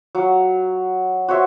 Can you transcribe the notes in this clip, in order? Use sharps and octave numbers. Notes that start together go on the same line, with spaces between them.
F#3
F#4 C5 C#5 E5